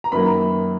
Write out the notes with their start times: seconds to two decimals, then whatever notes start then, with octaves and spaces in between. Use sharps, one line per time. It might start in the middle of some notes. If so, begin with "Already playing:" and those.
0.04 A#5
0.12 F#2 D#3 F#3 A#3 B5